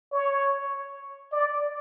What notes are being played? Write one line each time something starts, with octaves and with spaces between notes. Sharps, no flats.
C#5
D5